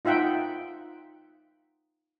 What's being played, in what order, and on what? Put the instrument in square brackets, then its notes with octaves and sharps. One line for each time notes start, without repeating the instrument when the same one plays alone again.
[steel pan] D#4 F4 E5 F#5 G5